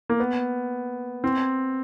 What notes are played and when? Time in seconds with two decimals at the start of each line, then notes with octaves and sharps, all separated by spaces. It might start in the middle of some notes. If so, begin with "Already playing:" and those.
0.09 A#3
0.20 B3
1.24 C4